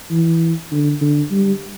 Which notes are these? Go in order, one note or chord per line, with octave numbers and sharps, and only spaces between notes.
E3
D3
D3
G3